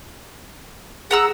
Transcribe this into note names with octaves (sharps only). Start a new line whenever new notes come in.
G#4 F#5 A#5 E6